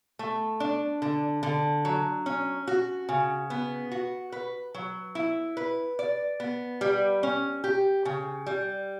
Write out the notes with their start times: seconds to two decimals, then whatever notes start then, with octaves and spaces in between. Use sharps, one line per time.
0.19 A3
0.60 D4
1.02 D3
1.43 D3
1.85 F#3
2.26 C#4
2.67 F#4
3.09 C#3
3.50 B3
3.91 F#4
4.32 B4
4.74 F#3
5.15 E4
5.57 B4
5.99 D5
6.40 B3
6.81 G3
7.23 C#4
7.64 G4
8.05 C#3
8.46 G3